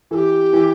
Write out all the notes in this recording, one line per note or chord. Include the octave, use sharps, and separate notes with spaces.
E3 G4 A4
E3